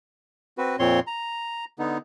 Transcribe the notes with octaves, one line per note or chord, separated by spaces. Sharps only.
C4 F#4 B4
F2 A#2 C4 C#5 C6
A#5
D3 B3 D#4